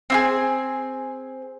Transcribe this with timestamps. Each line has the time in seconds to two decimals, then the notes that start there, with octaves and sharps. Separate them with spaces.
0.10 C4 E4 G#4